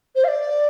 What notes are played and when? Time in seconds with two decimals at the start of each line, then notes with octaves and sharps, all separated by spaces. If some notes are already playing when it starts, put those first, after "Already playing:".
0.15 C5
0.24 F5
0.28 D5